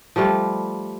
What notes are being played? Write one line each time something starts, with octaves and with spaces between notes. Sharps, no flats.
F3 G3 A3 F4